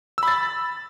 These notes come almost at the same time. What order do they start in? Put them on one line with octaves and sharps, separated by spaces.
E6 B5 A6